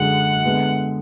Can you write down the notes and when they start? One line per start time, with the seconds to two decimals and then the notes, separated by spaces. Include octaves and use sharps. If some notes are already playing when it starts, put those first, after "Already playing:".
Already playing: F#2 D3 G#3 F#5
0.45 D3 G#3 B3